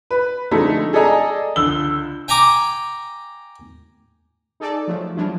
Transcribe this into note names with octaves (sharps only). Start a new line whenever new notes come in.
B4
D3 F3 G#3 A3 C4 D#4
G#4 A4 D5 D#5 G#5 A#5
C#2 D3 E6 G7
G5 G#5 A#5 D6
D#4 G#4 A4 D5
F3 F#3 A3
F3 F#3 G#3 D4 E4 F4